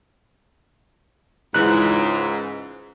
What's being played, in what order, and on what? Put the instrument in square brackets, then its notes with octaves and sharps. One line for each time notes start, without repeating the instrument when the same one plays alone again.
[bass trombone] C#2 [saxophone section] G#2 [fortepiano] E3 F#6